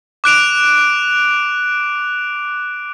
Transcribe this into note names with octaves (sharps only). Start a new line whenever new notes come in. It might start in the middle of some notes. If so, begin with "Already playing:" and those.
D6 F#6 D7 F7